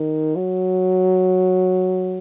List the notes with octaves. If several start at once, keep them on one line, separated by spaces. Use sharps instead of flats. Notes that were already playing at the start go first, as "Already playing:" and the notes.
Already playing: D#3
F#3